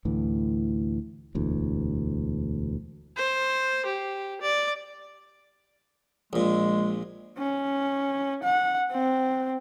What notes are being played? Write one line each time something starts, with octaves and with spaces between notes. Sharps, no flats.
D2 A2 E3
E1 D2 E3
C5
G4
D5
A#1 A#2 G#3
C#4
F#5
C4